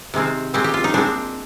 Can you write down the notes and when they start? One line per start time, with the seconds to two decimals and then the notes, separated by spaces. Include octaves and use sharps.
0.14 C3 D#3 G#3 C4
0.54 A#2 G#3 C4 G4
0.64 G4
0.74 F4
0.84 D#4
0.94 A#2 G#3 C4 D4